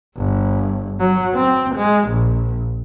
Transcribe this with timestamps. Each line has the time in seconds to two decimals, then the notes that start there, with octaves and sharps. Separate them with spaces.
0.17 G1
0.99 F#3
1.34 C4
1.76 G#3
2.09 A#1